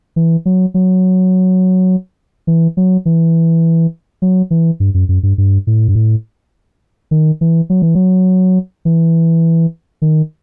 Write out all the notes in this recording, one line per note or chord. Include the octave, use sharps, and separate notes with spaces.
E3
F#3
F#3
E3
F#3
E3
F#3
E3
G2
F#2
F#2
G2
G2
A2
G2
A2
D#3
E3
F#3
E3
F#3
E3
D#3